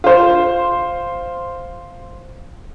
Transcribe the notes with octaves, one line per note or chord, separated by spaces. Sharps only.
F4 C5